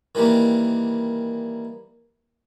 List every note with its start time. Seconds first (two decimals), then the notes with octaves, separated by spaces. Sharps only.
0.15 D#3 E3 G3 A#3